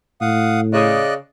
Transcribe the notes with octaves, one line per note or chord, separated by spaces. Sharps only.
A2 F5 F#5 D#6
C#3 D5 D#5 F#6